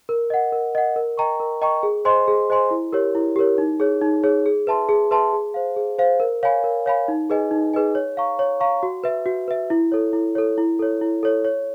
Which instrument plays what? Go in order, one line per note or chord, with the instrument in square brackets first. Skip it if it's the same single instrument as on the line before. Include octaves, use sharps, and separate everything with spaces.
[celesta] A#4
D#5 F#5
A#4
D#5 F#5
A#4
D#5 G5 A#5 C#6
A#4
D#5 G5 A#5 C#6
G#4
C5 D#5 G#5 C6
G#4
C5 D#5 G#5 C6
E4
G4 A#4 C#5
E4
G4 A#4 C#5
D#4
G#4 C#5
D#4
G#4 C#5
G#4
B4 E5 A5 C6
G#4
B4 E5 A5 C6
G#4
C5 F5
G#4
C5 F5
A#4
C#5 F5 G#5 B5
A#4
C#5 F5 G#5 B5
D#4
G#4 B4 D#5 G#5
D#4
G#4 B4 D#5 G#5
C#5
F5 A#5 C#6
C#5
F5 A#5 C#6
F#4
B4 E5
F#4
B4 E5
E4
A4 C#5
E4
A4 C#5
E4
A4 C#5
E4
A4 C#5
C#5